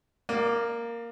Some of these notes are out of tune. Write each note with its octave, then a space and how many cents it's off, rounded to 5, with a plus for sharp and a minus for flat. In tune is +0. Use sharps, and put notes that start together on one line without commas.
A#3 +0 D5 +30